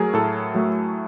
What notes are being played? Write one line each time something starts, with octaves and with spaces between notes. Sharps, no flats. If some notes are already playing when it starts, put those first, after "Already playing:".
Already playing: F#3 A3 G#4 A#4
A2 A4
F#3 A3